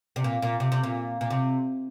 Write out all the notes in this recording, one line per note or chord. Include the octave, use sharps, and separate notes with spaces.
C3
A#2
A#2
C3
C3
A#2
A#2
C3